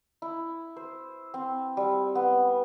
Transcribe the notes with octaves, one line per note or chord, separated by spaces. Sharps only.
E4
C5
C4
G3
B3